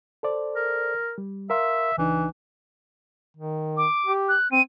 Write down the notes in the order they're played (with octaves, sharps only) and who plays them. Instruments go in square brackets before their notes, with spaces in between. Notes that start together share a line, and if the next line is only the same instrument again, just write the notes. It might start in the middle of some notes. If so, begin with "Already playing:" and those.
[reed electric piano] A4 C5 D5
[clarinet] A#4
[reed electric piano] G3
[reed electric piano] A#4 F5 C6 [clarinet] E5
[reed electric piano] C#2 D4 D#4 [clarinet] E3
[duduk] D#3
[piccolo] D6
[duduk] G4
[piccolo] F#6
[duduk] C4 [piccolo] D#7